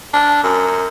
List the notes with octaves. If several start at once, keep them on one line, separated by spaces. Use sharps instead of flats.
D4
F#2